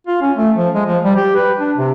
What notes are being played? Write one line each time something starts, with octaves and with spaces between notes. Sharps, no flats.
F4
C#4
A3
F3
G#3
F3
G3
G4
B4
D4
C3